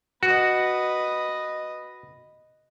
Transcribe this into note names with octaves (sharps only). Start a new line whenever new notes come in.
F#4 B4 D#5